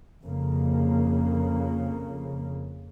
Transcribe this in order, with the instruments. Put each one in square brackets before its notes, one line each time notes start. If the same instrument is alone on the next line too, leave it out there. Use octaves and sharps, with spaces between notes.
[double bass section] F2 C#3 A#3